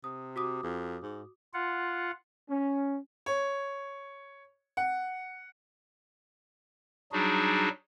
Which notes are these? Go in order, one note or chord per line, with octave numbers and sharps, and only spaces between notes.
C3 D#6
F#4 D6 D#6
F2
G#2
F4 F#5
C#4
C#5
F#5
F#3 G3 D4 D#4 F#4 G#4